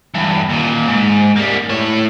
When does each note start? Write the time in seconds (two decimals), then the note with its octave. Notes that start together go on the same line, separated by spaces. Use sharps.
0.14 E2 G2
0.49 D#2 A#2
0.87 G#2
1.36 G3 A#3
1.70 A2 C#5